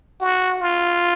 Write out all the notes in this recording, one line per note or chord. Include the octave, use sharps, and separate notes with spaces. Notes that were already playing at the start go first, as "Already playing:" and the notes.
F#4
F4